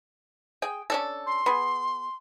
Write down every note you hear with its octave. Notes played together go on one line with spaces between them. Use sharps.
G#4 G5
C#4 D4 A4
C6
B3 G#4